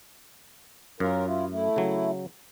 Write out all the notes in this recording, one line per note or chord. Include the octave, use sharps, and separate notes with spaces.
F#2 C#4 F4 A#4
E4 F4
A3 E4
C#3 F#3